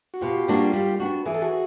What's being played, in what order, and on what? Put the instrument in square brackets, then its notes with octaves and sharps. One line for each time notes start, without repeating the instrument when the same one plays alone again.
[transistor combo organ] F#4
[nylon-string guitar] B2 [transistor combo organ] F4 G4
[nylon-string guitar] G3 A#3 D4 F#4
G3
B3 D4 F#4
[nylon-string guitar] E3 [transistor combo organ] G#4
[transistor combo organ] A4
F#4 G#4